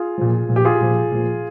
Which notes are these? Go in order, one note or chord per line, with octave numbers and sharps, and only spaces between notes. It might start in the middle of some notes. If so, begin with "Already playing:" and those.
Already playing: F4 G#4
A#2 F3
A#2 F3
G4
F4 G#4
A#2 F3
A#2 F3